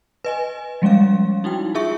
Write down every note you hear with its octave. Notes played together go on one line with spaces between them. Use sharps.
B4 D#5 G#5
F3 G3 G#3 C#4 F5
D#4 E4 F#4 G5
F4 G#4 E5 C#6